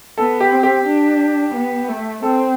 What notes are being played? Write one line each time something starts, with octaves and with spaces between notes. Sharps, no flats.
B3 A4
G4
C4
G4
D4
B3
A3
C4 A4